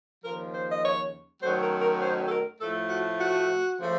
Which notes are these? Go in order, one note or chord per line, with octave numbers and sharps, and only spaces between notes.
D#2 C#3 F3 A#4
C5
D#5
C#5
F#2 D#3 F#3 A3 C5
A#4
A#4
C5
A4
A#4
A2 F3 A3 A4
F#4
F#4
C#3 F3 A3